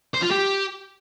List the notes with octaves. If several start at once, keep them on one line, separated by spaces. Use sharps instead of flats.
C5
F4
G4